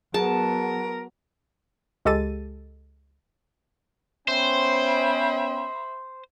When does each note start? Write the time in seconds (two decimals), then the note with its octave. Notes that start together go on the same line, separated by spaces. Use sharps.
0.14 F#3 B3 G#4 A#4 A5
2.05 C#2 G#3 G4 A4 A6 D#7
4.28 B3 C#4 C5 E5 G5 B5